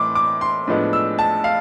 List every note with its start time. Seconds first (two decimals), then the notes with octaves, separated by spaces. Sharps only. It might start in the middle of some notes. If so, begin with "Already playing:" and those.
Already playing: A2 E3 C6 D6
0.15 D6
0.41 C6
0.68 A2 F3 G#3 B3 D4
0.93 E6
1.19 A5
1.44 F5